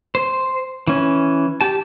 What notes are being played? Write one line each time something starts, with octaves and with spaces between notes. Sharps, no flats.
C5
E3 C#4
G4 A5